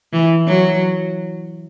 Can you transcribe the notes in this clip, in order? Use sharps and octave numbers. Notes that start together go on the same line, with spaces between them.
E3
F#3